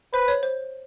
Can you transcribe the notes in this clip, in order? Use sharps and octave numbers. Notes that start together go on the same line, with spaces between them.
B4 C5
C#5
C5